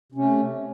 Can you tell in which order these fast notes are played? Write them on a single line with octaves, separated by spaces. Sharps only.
C3 C#4 A3